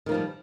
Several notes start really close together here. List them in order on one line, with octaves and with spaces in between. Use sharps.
D#3 A#3 F3 G3